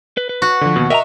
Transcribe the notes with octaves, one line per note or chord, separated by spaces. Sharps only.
B4
B4
F#4
D3 F3
D#2 B2
A#4 D#5 E5 G5 A#5